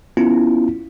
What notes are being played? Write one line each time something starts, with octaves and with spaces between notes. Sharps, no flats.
B3 C#4 E4 F4